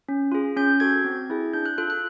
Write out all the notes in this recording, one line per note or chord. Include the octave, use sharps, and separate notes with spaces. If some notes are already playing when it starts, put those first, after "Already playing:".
C#4
F4 G#4
C#4 G6
F#4 A4 G#6
C4
E4 G#4
D4 G6
F#6
F4 A4 F#6
F#6